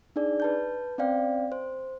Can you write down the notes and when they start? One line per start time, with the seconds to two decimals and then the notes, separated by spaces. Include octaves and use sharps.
0.16 D4 D#4 G#4 D5
0.40 B4 A5 G6
0.98 C4 C#4 C5 D5 F5 G5
1.52 C5